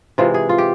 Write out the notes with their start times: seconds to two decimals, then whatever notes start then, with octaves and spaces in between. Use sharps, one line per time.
0.18 C3 E3 G#3 F4
0.34 G#4
0.49 F4
0.58 G4